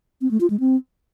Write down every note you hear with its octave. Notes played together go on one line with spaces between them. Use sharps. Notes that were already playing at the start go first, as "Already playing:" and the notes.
C4
A3
F4
G#3
C4